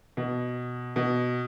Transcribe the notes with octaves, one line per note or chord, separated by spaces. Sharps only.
B2
B2